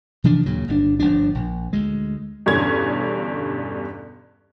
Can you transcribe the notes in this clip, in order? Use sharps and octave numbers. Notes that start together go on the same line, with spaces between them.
C3 E3 F3 D4
D#2 A#2 C#3 F#3
G1 C#3 D4
G1 F3 D4
A#1
D2 G#3
E2 G2 B2 D3 C#4 G#6